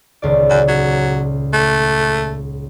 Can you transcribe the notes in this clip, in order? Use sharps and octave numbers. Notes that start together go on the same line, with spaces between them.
D#1 C#2 D5
F#2
F#3
A3